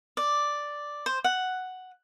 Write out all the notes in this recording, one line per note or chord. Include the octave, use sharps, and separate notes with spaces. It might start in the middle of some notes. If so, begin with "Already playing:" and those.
D5
C5
F#5